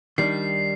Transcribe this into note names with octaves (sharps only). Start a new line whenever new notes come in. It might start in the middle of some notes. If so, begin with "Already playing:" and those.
D#3 G3 D4 C7